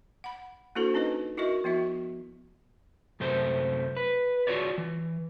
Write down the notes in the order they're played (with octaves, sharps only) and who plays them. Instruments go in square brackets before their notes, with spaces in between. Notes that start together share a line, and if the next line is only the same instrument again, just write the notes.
[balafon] F#5 B5
A#3 D4 E4 F#4 A4 C5
C#4 D#4 E4 B4 D#5
E4 F#4 A#4 D#5 E5
F3 B3 E4 F#4 E5
[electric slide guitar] F#2 C3 A3 C5
B4
F4 F#4 G#4 C#5 D5
E3